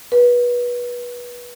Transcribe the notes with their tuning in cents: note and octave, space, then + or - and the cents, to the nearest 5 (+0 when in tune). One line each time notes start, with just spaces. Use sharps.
B4 -25